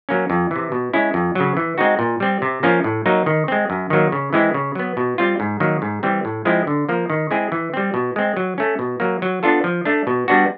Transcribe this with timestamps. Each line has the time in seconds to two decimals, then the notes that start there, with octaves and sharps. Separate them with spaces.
0.09 F#3 A#3 C#4
0.30 F2
0.51 C3 E3
0.72 B2
0.93 G#3 C#4 E4
1.14 F2
1.35 C#3 F#3
1.57 E3
1.78 G#3 C4 D#4 F#4
1.99 A#2
2.20 G3 C4
2.42 C3
2.63 F3 A#3 C#4 F4
2.84 A2
3.06 F#3 A#3 D#4
3.26 D#3
3.48 G#3 C4
3.70 F#2
3.90 D#3 F#3 A#3
4.12 C#3
4.33 E3 G#3 C4 E4
4.54 C#3
4.75 F#3 B3
4.97 B2
5.18 G3 C4 F4
5.40 G#2
5.60 D#3 F#3 A#3
5.82 G#2
6.03 E3 G3 C4
6.25 A2
6.45 F3 G#3 C4 E4
6.67 D3
6.89 F3 A#3
7.10 D#3
7.31 G#3 C4 E4 G#4
7.52 E3
7.74 G3 C4
7.94 B2
8.16 G#3 C4
8.37 F#3
8.58 A3 C#4
8.79 B2
9.00 F#3 A#3
9.22 F#3
9.43 B3 D4 F4 A4
9.64 F3
9.85 A3 D4
10.07 B2
10.28 G3 B3 D4 F#4